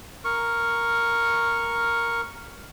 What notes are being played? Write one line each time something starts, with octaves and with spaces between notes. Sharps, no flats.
A#4 C#6